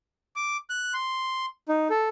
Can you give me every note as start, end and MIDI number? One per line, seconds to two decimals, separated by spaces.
0.36 0.57 86
0.70 0.93 90
0.94 1.46 84
1.69 1.88 63
1.90 2.09 69